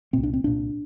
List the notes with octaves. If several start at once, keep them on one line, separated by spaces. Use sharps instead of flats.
C2 A#2 C4
D4
C4
C2 A#2 D4